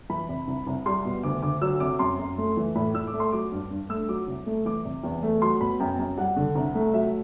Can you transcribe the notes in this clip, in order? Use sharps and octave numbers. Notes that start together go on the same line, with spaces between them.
E3 B5
C3
C2
C2
G3 C6
B2
D2 D6
D2 D6
F#3 E6
C3 D6
F#2 C6
F#2
A3
E3
A2 B5
A2 E6
D6
A3
C6
F#3 D6
G2
G2
A3 E6
F#3 D6
C2
A3
E3 D6
C3
E2
A3
F#3 C6
B2 B5
F#2 G5
F#2
G3 F#5
D3
C2
A3
F#3 E5